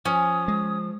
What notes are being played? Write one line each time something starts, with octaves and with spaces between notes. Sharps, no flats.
F3 C#4 D#6
G#3